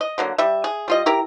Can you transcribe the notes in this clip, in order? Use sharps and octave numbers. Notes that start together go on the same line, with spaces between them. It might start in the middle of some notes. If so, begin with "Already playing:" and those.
D#5
D3 F#3 A#3
G3 E5
G#4
G3 F4 D#5
E4 G4 A#4 A#5